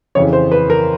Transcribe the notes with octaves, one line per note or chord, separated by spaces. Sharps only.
F2 C#3 E3 C#5
C5
B4
A#4